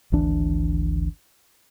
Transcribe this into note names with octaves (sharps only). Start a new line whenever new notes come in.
G#1 D2 E3 D4